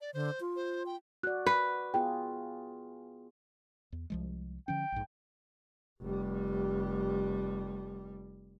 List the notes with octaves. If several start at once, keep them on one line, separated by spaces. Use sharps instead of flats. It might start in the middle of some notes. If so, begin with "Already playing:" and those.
D5
D3 C5
F4
C5
G5
F#4 D5 F#6
B4
B3 F4 G#4 G5
E2
C2 F3 G#3
D3 F3 C#4 G5
A#1 G#2
F1 G3